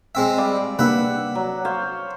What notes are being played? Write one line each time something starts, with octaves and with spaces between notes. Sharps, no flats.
G#3 C4 E5
G3 D5 F5
C3 A#3 D4 B4 E5 F#5
F#3
C5 C#5 F5